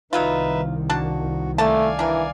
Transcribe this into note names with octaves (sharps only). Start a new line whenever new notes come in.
C2 D#3 F#3 B3 D#4 F4 B4 E5
A#3 D4 F#4 A5
A3 A#3 D5 F5 G#5 A5
E3 D4 A#4